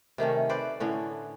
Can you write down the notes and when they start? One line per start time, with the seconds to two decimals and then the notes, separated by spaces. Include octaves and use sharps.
0.18 C3 D#3 A3 C#4
0.49 B4 C5 D5
0.80 A2 D3 C#4